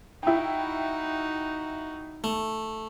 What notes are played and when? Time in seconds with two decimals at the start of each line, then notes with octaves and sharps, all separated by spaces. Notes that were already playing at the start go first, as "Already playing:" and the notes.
0.23 D#4 E4 F#4 G5
2.24 A3